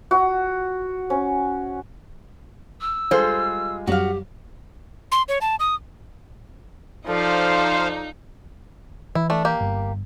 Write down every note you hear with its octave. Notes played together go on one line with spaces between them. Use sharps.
F#4
C#4
E6
G3 G#3 F4 A4 C5
F#2 F#3 G3 F#4 G4 F5
C6
C#5
A5
D#6
F3 D#4 A4 C5 D5 F5
E3 E4
A3 D4
A#3 G4
G1